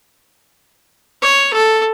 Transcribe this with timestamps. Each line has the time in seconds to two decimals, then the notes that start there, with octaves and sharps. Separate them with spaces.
1.22 C#5
1.53 A4